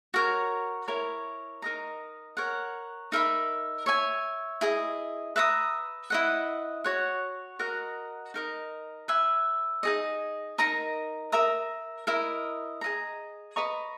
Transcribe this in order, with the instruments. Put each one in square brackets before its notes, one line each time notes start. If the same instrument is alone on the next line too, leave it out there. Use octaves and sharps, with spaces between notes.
[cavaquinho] F#4 A#4 C#5
E4 A#4 C#5
D#4 A#4 D#5 A#5
A#4 C#5 F#5
D#4 A#4 E5 B5
C#5 E5 G#5
E4 G#4 D#5
B4 E5 A#5 D#6
E4 B4 D#5 F#5
F#4 C#5 F#5
F#4 A#4 D#5 F#5
D#4 A#4 D#5
B4 E5 G#5
D#4 G#4 D#5
D#4 A#4 D#5 A#5
A#4 E5 A#5 D#6
E4 A#4 D#5
G#4 D#5 A#5
B4 D#5 A#5 C#6